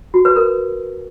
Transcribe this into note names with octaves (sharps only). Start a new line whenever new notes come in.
F#4
B4
A#4